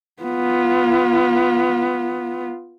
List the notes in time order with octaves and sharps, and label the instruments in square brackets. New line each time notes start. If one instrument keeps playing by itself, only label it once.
[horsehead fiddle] B3 F4